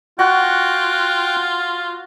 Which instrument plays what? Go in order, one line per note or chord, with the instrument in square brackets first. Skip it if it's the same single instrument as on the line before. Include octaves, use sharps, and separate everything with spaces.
[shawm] F4 [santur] F#4 [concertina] G5 F#6